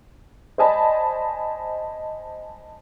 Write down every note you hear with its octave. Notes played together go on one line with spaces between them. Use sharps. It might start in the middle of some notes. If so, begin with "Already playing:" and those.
C5 D5 D#5 G#5 A5 B5